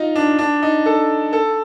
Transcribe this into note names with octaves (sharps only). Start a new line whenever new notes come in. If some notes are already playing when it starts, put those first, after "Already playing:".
Already playing: D#4 F4
D4
D4
D#4
A4
A4